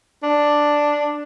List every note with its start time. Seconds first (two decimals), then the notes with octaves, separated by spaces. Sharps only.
0.23 D4